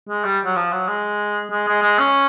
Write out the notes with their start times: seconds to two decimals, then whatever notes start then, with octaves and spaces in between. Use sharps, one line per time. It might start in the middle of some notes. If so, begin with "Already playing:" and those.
0.08 G#3
0.24 G3
0.45 F#3
0.56 F3
0.72 F#3
0.88 G#3
1.51 G#3
1.68 G#3
1.83 G#3
1.99 C#4